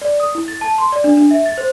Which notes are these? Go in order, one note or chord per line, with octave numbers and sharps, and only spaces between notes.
D5
D#6
E4
A6
A5
C6
D5
D4
D4
E5
A6
C5